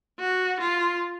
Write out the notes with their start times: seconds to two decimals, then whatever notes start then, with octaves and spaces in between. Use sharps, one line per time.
0.19 F#4
0.60 F4